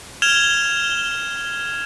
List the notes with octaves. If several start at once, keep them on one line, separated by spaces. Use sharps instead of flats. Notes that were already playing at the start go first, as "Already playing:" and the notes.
F6 G#6 E7 F7 G7